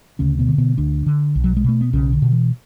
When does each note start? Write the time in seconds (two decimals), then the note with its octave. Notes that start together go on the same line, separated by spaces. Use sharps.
0.19 D2 C#3 C#4
0.39 B2 B3
0.48 D3
0.58 B2 B3
0.77 D2 D3 D4
1.06 D3
1.35 B1
1.44 F#3
1.57 G#3
1.64 B2 A3
1.81 B3
1.93 B1 C#3 C#4
2.13 D3
2.22 B2
2.32 E3